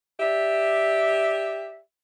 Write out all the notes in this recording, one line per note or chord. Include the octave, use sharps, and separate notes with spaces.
G4 D5 E5